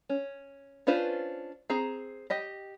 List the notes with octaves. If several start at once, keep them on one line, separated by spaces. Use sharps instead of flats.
C#4
C#4 D4 F4 B4 C5
C4 G#4 A#5
G4 D#5 G5